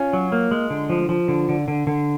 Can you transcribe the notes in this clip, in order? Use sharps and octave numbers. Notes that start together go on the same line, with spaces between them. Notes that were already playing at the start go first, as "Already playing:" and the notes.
Already playing: C#4 F4
F#3
A#3
G#3
D3
F3
F3
D3
D3
D3
D3